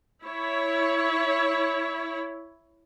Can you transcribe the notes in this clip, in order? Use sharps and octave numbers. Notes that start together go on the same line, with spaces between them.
E4 C#5